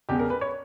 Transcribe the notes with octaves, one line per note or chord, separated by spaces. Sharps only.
E1 E2 C#3 G4
A#4
B4
C#5